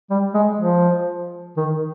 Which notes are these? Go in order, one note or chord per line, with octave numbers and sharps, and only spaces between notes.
G3
G#3
F3
D#3